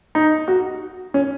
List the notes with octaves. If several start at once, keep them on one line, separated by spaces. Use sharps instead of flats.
D#4
F#4
C#4